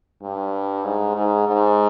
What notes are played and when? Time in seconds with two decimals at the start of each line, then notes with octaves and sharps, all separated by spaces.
0.22 G2
0.85 G#2
1.16 G#2
1.47 G#2